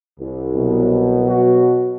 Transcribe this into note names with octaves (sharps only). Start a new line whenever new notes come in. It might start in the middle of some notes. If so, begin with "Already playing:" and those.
C2
B2 F#3
F#4